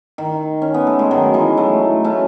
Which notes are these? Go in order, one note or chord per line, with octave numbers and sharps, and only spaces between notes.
D#3
C#4
B3
A3
G#3
D#3 F#3
E3 G#3
F#3 A3
A3 C#4